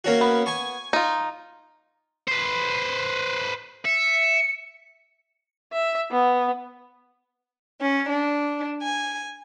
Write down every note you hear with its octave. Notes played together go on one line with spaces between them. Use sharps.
A#3 C#4 F#4
B3
G#5 C#6
D#4 F4
B4 C5
E5 C#7
E5
B3
C#4
D4
G#5